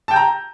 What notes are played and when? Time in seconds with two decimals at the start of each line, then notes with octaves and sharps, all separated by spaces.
0.08 A5
0.11 G5
0.13 G6
0.16 A#5